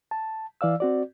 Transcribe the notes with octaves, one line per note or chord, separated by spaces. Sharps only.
A5
E3 D5 F5 E6
C4 F#4 D5